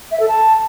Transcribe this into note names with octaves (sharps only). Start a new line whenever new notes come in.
E5
A4
A5